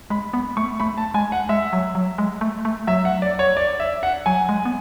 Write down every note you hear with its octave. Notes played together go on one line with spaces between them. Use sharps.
G#3 B5
B3 B5
A3 C#6
A3 B5
A5
G#3 G#5
F#5
G#3 E5
F#3
F#3
G#3
A3
A3
F#3 E5
F#5
D5
C#5
D5
E5
F#5
F#3 G#5
G#3
B3